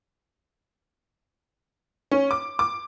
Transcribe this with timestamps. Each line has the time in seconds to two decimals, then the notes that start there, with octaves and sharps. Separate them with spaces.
2.11 C#4
2.31 D6
2.59 D6